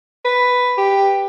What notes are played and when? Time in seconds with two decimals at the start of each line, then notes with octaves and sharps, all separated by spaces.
0.25 B4
0.77 G4